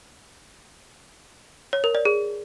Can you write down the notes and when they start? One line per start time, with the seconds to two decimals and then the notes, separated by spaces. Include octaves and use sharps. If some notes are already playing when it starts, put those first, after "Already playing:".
1.73 C#5
1.84 A#4
1.95 D5
2.05 G#4